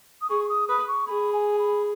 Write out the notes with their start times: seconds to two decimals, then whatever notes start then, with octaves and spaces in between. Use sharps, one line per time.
0.21 D#6
0.29 G#4 C#6
0.44 C#6
0.49 D#6
0.68 B4 D#6
0.87 C#6
1.07 G#4 B5
1.33 G#5
1.59 B5